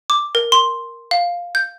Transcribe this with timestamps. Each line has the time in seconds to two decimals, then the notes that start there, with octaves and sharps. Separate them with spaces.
0.10 D6
0.35 A#4
0.52 C6
1.11 F5
1.55 G6